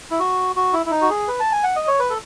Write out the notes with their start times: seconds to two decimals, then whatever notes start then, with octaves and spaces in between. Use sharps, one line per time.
0.11 E4
0.20 F#4
0.56 F#4
0.73 E4
0.86 E4
0.91 D#4
1.02 F#4
1.10 G#4
1.28 B4
1.40 A5
1.52 G#5
1.64 F#5
1.76 D#5
1.87 C#5
1.99 B4
2.10 A4